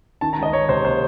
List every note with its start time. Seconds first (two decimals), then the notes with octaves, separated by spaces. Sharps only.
0.21 D#3 A5
0.33 A#5
0.38 C#2 D#5
0.53 C#2 C#5
0.69 C3 C5
0.85 A#3 C5